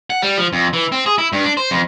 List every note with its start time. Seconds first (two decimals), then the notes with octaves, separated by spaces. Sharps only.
0.10 F#5
0.22 G3
0.38 F3
0.53 F2
0.73 E3
0.92 C4
1.06 G#4
1.18 E4
1.33 G2
1.44 D4
1.57 C5
1.71 F2